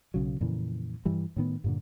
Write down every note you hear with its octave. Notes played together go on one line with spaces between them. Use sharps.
B1 C#3 F#3
F2 A#2 C#3 E3
G2 E3 G3
A2 D#3 B3
G2 A#2 D3